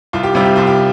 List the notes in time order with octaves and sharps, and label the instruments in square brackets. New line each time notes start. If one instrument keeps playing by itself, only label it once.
[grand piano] C2 [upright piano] F4
[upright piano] G4
[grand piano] C3 G3 [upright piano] F4
[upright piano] G4
[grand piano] C2 [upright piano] F4
[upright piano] G4